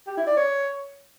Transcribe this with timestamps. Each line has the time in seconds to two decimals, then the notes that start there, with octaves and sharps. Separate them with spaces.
0.07 G4
0.17 E4
0.27 D5
0.37 C#5